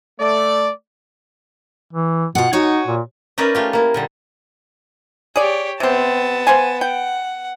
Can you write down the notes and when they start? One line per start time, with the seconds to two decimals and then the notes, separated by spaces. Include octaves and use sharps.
0.20 A3 D5
1.93 E3
2.35 B2 F4 F#5
2.53 D#4 F#4 C#5 G#5
2.87 A#2
3.38 C#4 D#4 A#4 B4 D5 E5
3.55 A3 F4 G4
3.73 A#3 E4
3.94 A#2 D3 G3
5.36 G4 G#4 C#5 D5
5.80 C3 B3 C4 A5
6.47 C5 F5 G#5
6.81 F#5 G5